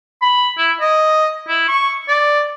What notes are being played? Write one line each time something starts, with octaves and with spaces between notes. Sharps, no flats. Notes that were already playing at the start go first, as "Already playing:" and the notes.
B5
E4
D#5
E4
C#6
D5